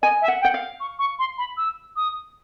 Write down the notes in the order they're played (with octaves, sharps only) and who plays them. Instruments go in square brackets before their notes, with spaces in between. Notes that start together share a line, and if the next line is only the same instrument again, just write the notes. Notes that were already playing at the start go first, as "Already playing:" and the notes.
[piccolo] D#5 [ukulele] G#5
[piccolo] E5
[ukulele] F#5
[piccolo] G5
[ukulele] F#5
F5
[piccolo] C#6
C#6
C6
B5
E6
D#6